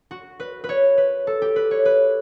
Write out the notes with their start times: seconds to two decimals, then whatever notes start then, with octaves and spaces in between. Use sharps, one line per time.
0.11 F#4
0.40 B4
0.64 B4
0.69 C#5
0.97 B4
1.27 A4
1.42 G4
1.56 B4
1.71 C#5
1.85 B4